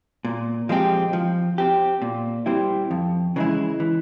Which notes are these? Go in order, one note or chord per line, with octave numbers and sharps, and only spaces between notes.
A#2
F3 G#3 C4 G4
F3
C4 G4
A#2
G3 C4 E4 G4
F2
C#3 E3 G#3 E4
E3